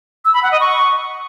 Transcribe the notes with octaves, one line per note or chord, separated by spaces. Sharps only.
E6
B5
F#5
D#5
C#6